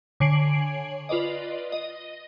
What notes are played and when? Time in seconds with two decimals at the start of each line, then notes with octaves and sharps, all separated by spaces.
0.20 D3 C#5 G#5 C7 D7 F#7
1.09 F4 B4 D5 D#5
1.72 D#5